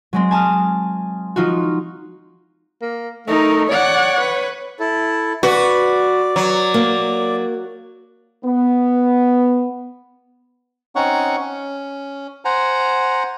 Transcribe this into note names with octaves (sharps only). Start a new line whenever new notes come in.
F#3 G#3 C4
G#5 A5 D#6 F6
F3 D#4 F4 F#4
A#3
A3 D#4 A#4
C#5 D5 F#5
B4
E4 A4
F#4 B4 D5
F#3
A#3
B3
C4 C#4 D#4 C#5 F#5 C#6
C#4
C5 F#5 G#5 A#5